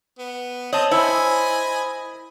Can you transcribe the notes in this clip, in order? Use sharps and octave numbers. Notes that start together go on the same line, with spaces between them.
B3
C4 C#5 D#5 A5
E4 C5 D#5 G#5 B5